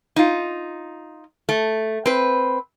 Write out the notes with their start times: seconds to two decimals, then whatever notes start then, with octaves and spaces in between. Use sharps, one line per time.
0.16 D#4 F4
1.49 A3
2.06 C4 B4